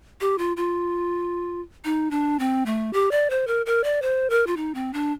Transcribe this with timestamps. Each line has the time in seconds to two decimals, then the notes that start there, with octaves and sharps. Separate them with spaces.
0.21 G4
0.38 F4
0.57 F4
1.85 D#4
2.11 D4
2.39 C4
2.66 A3
2.93 G4
3.11 D5
3.30 C5
3.47 A#4
3.66 A#4
3.84 D5
4.02 C5
4.30 A#4
4.47 F4
4.57 D#4
4.74 C4
4.93 D4